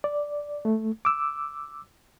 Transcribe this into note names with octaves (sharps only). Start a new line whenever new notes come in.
D5
A3
D6 E6